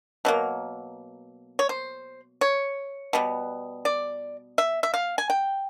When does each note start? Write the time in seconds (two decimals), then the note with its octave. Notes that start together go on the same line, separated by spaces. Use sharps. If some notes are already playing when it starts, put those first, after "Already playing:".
0.25 B2 F#3 A#3
1.59 C#5
1.69 C5
2.41 C#5
3.13 B2 G3 B3
3.85 D5
4.58 E5
4.83 E5
4.94 F5
5.18 G#5
5.30 G5